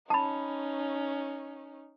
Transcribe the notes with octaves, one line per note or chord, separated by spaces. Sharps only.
C#4 D#4 A5 B5